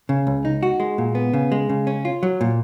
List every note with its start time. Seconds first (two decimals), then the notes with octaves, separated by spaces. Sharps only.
0.09 C#3
0.27 C#2
0.45 D#4
0.63 F#4
0.80 G#3
0.98 A#2
1.15 B3
1.33 C#3
1.52 G#3
1.69 C#3
1.87 C#4
2.05 F4
2.23 F#3
2.41 A#2